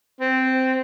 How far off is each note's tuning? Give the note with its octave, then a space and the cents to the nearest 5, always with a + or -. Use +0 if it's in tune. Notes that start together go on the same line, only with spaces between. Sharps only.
C4 -10